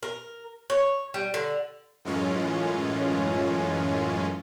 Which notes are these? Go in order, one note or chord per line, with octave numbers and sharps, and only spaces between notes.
A#4
C#5
G3
D3
F#2 A2 E3 G#3 C#4 F4